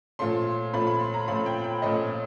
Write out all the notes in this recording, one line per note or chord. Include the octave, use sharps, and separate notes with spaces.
A#2 F3 A3 C#4 C6
A#2 F3 A3 C#4 B5
B5
C6
A#5
A#2 F3 A3 C#4 B5
G5
G5
A#2 F3 A3 C#4 D#5